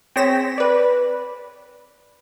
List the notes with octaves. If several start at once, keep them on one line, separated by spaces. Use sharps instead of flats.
C4 G#4 C#5 A#6 B6 E7
B4 D5